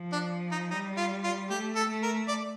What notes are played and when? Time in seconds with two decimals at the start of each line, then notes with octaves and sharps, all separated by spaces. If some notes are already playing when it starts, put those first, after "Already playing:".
Already playing: F3
0.12 D4
0.52 D#4
0.71 G3 D#4
0.97 F4
1.24 F4
1.50 A3 G4
1.76 A4
1.89 A3
2.03 A#4
2.28 D5